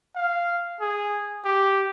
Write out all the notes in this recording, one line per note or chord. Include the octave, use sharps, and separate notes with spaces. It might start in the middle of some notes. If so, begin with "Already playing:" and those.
F5
G#4
G4